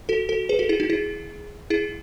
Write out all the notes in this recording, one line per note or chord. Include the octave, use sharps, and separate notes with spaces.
F#4 A4
F#4 A4
G#4 B4
F#4 A4
E4 G#4
D#4 F#4
E4 G#4
E4 G#4